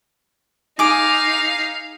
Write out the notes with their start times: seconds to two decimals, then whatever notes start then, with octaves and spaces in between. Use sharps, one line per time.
0.79 D#4 G#4 F5 D6